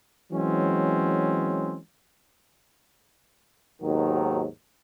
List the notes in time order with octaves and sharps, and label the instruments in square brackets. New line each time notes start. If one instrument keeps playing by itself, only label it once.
[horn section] E3 F#3 G#3 C4 C#4
[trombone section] D#2 G#2 B2 D#3 F#3